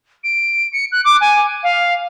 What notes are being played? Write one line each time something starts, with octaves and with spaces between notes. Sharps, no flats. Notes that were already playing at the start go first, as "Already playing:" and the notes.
D7
C#7
F#6
D6
G#5
F5